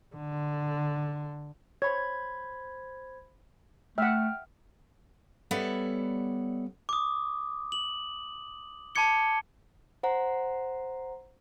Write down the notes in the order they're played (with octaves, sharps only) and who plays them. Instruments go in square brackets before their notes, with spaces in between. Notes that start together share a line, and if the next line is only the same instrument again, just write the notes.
[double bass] D3
[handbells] C5 B5 G#6 [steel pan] C#5
[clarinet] A3 [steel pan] E5 F#5 [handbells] G5 F6
[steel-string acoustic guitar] G3 B3 A4 C#5 D5 E5
[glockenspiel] D6 D#6
F#7
A5 B5 D6 G#6 C#7 G7
[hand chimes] C5 F#5 A#5